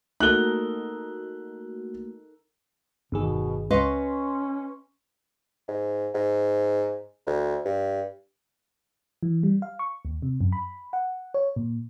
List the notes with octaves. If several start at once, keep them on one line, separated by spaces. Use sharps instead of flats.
A3 A#3 D#4 F#4 A4 A#4 F#6 G7
G1 E2 B2 D#3 G#4
C#2 C#4 B4 D#5 F5 C6 C#6
G#2
G#2
D2
G2
E3
G3
F5
C#6
D#2
C3
F#2
B5
F#5
C#5
A#2